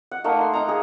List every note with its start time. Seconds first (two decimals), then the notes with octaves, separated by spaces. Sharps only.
0.11 F#5
0.24 A3 A#3 D#4 F#5
0.41 C6
0.53 D#4 A#5
0.69 G#4